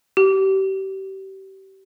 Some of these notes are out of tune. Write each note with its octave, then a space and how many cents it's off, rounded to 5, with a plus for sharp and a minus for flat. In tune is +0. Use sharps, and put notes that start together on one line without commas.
G4 -30